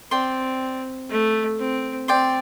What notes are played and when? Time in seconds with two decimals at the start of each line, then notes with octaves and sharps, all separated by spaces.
0.11 C4 D5 G5 C6
1.10 A3
1.59 C4
2.08 C4 D5 G5 C6